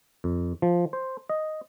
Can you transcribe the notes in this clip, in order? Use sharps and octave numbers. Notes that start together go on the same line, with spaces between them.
F2
F3
C5
D#5